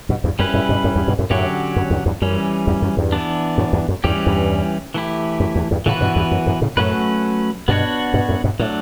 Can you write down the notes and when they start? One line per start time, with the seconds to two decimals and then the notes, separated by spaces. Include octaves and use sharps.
0.09 G2 B2
0.24 E2 G2
0.39 F#2 G3 C#4 E4 B4
0.54 F#2 A2
0.69 G2 B2
0.84 F#2 A2
0.96 E2 G2
1.08 G2 B2
1.19 F#2 A2
1.30 F#2 A2 D3 F#3 C#4 G4 C#5
1.76 F#2
1.90 E2 G2
2.06 E2 G2
2.22 F#2 E3 G3 C#4
2.67 E2 G2
2.82 F#2
2.97 E2 G2
3.12 E3 B3 D4
3.58 F#2 A2
3.73 E2 G2
3.89 F#2
4.04 E2 G2 E3 G3 C#4 G4
4.26 E2 G2
4.94 E3 A3 E4 G4
5.40 F#2
5.55 E2
5.71 E2 G2
5.86 A2 C#3 E3 B3 F#4 B4
6.01 G2 B2
6.16 E2 G2
6.31 F#2
6.46 F#2 A2
6.61 A2 C#3
6.77 F#2 A2 F#3 A3 C#4 F#4 B4
7.68 G2 B2 B3 D4 F#4 C#5
8.14 G2 B2
8.29 F#2 A2
8.44 G2 B2
8.59 A2 F#3 A3 D4